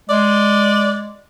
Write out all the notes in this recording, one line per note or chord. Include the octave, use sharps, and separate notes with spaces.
G#3 D5